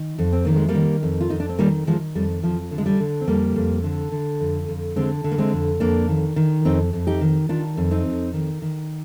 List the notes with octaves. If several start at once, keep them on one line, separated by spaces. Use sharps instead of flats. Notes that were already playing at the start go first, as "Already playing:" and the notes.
Already playing: D#3
F2
C4
D#3 A#3
G#3
G3 A#3
D#3
F2
F4
F2 D#4
D4
C4
D#3 G3 A#3
D#3 F3 G#3
F2 G3
F2 F3
D3
G#3
G3
D3
C4
F2 G3 A#3
F2
D3
D3
F2
F2
D3 G#3 C4
D3
A#3
G#3 C4
F2
F2 A#3 D4
D#3
D#3
F2 C4 D#4
F2
D#4 G4
D#3
D#3 D4 F4
F2
C4 D#4
F2
D#3
D#3